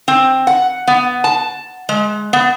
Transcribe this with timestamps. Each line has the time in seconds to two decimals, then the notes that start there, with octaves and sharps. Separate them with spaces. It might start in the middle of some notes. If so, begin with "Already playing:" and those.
0.08 C4
0.47 F#5
0.87 B3
1.24 A5
1.89 G#3
2.33 B3